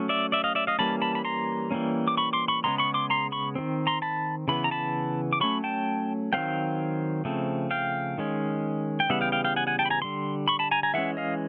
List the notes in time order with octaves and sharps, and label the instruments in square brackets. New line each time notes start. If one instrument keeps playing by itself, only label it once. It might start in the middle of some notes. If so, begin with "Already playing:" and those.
Already playing: [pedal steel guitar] F#3 A3 C#4
D5 E5
D5 E5
D#5 F5
D5 E5
D#5 F5
E3 G3 A#3 C#4 A5 B5
A5 B5
B5
A#5 C6
E3 G3 A#3 C#4
D6
B5 C#6
C6 D6
B5 C#6
C#3 F3 G#3 B3 A#5 C6
B5 C#6
C6 D6
A#5 C6
B5 C#6
D#3 G3 C4
A#5 C6
A5 B5
C#3 E3 B3 B5
A#5
A5 B5
D6
F#3 A3 C#4 B5 C#6
G5 A5
D#3 F#3 A3 C4 F5 G5
C#3 F3 A3 C4
F5 G5
D#3 G#3 C#4
G5
C#3 E3 G3 B3 E5 F#5
F5 G5
F5 G5
F5 G5
F#5 G#5
F#5 G#5
G5 A5
B5
G#5 A#5
D3 G3 C6
B5 C#6
A5 B5
G#5 A#5
G#5 A#5
E3 G#3 C#4 E5 F#5
D#5 F5